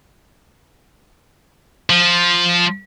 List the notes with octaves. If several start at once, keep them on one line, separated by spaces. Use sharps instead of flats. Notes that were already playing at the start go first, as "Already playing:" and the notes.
F3